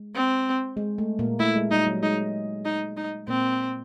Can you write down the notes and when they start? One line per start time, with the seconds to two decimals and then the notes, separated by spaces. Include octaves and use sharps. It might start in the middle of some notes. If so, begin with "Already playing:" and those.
Already playing: G#3
0.15 C4
0.77 G#3
0.98 A3
1.19 A#2 A#3
1.39 A3 E4
1.55 G#3
1.71 G3 D#4
1.87 F#3
2.03 G#3 D#4
2.65 D#4
2.97 D#4
3.28 A#2 A#3 C4